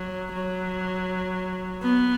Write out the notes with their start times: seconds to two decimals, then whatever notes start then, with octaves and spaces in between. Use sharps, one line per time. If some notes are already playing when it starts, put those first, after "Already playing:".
Already playing: F#3
0.33 F#3
1.82 B3